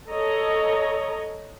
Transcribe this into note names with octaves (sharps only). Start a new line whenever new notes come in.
A4 C#5 D#5 A#5